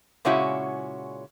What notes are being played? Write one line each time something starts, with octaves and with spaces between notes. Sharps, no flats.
A#2 C#3 G#3 C#4 E4 F#4